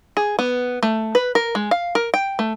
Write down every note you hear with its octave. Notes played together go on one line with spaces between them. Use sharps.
G#4
B3
A3
B4
A#4
G#3
F5
A#4
G5
A3